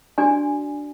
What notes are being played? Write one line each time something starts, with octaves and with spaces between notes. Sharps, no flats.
D4 F#4 D5 G#5